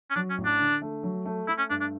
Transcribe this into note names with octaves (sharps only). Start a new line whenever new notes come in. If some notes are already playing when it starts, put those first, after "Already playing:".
C#4
F#3 D4
C#4
A1
D4
D3
A3
F#3
A3
A3 E4
C#4
G2 D4
D4